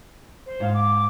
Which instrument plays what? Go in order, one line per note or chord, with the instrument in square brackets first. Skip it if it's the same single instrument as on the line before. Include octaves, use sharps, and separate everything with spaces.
[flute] C5
[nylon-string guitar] G#2 F5
[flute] D6